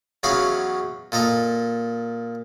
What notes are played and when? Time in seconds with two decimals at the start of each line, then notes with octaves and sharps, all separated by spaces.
0.23 E2 F#3 C#4 F5 B5 D#6
1.12 A#2 A4 D#5 A#5